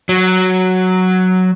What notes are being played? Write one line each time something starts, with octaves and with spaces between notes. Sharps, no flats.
F#3